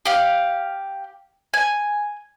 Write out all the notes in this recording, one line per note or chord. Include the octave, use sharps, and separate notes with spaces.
G4 F5
G#5